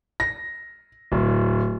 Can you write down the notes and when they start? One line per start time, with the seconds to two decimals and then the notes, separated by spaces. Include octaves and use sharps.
0.20 A#6
1.12 D1